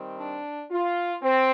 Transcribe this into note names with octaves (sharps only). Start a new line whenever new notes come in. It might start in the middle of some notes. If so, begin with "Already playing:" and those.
Already playing: D#3 G3 C4
D4
F4
C4